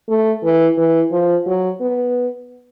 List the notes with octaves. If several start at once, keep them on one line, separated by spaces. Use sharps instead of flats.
A3
E3
E3
F3
F#3
B3